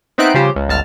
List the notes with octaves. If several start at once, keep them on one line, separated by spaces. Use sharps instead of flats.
B3 C4 D#4 E5 F#6 D7
C#3 F3 G3 G4 C5
C#2
G1 C#2 A5 F6